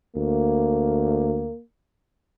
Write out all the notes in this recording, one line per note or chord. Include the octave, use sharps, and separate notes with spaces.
D2 A#3